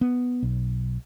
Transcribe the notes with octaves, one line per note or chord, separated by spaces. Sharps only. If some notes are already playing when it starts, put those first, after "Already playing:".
B3
B1